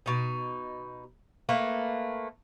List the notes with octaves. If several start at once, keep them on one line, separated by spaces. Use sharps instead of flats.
B2 D#4
A3 A#3 B4